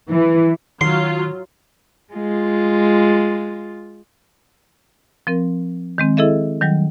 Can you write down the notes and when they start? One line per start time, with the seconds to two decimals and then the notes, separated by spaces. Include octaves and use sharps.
0.11 E3
0.81 D#3 F#3 F4 C6
2.13 G#3 F4
5.27 F3 C4 A#4
5.98 D#3 G#3 C4
6.17 E4 G#4 A4 D#5 E5
6.61 D#3 F#3 G3